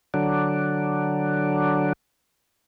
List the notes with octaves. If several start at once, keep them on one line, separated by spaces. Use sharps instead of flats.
D3 F#3 D4